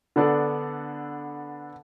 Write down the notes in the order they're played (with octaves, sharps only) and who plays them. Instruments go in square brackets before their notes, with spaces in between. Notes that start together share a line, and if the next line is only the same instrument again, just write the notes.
[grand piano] D3 B3 D4 A4 D5